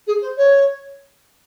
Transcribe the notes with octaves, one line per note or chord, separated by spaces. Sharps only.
G#4
C5
C#5